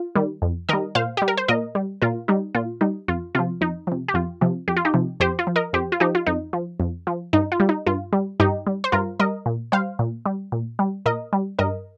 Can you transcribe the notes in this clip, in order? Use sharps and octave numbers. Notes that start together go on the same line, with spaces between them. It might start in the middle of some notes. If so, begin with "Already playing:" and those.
Already playing: F4
D#3 G3
F2
D#3 G3 A#4 D#5
A#2 C5 F5
G3 G4
A#4
C5
A#2 A#4 D#5
G3
A#2 F4 A#4
G3 D#4
A#2 F4
G3 D#4
F2 F4
C3 F3 F4
F2 D#4
C3 F3
G4
F2 F4
C3 F3
F2 G4
F4
D#4 G4
C3 F3
F2 G4 C5
F4
F3
A#4 D#5
F2 G4 C5
F4
F3 D#4 G4
F4
F2 D#4
F3
F2
F3
G2 D#4
F4
G3
D#4
G2 F4
G3
G2 D#4 G4
G3
C5
G2 F4 A#4
G3 A#4 D#5
A#2
G3 C5 F5
A#2
G3
A#2
G3
A#2 A#4 D#5
G3
G2 A#4 D#5